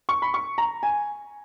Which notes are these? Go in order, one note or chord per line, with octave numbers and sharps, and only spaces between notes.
C#6
B5
C#6
A#5
G#5